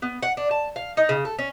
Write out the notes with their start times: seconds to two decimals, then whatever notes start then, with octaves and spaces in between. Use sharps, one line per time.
0.02 B3
0.23 F#5
0.37 D4
0.51 A5
0.76 F5
0.97 D#4
1.09 C#3
1.25 A4
1.39 C#4